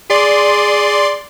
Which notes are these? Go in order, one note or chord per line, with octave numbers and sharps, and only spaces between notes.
G#4 D5 C6